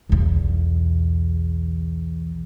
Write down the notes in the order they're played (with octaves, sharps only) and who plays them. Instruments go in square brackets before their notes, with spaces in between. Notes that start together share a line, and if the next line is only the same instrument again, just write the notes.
[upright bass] B1 E2